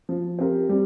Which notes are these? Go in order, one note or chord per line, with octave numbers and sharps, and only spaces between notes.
F3
C4 G4 A#4
G3